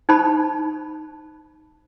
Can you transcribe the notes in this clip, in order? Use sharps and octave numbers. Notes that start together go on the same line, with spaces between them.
D#4 C5 A5 B5